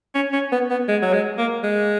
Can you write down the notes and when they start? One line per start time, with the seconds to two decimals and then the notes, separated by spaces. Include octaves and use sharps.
0.15 C#4
0.33 C#4
0.52 B3
0.71 B3
0.89 G#3
1.02 F#3
1.13 G#3
1.38 A#3
1.63 G#3